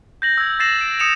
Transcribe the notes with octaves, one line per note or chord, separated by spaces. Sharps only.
G6 A#6 F#7
E6 G#6
E6 A6 A#6 C7 E7 F#7
A6 D7
D#6 C#7 E7 F7